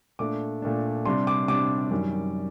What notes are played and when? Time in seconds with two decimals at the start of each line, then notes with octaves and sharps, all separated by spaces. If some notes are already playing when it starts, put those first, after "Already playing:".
0.19 A#2 A3 D4 D6
0.62 A#2 A3 D4
1.05 C3 G3 D4 C6
1.27 D6
1.48 C3 G3 D4 D6
1.91 F#2 D#3 G3